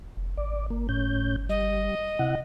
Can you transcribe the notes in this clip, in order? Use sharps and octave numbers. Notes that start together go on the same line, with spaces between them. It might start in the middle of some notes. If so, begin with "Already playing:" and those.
F1
G#1 D5
G1 A#3
A2 C#4 G6
G3 D#5
C3 E4 F#5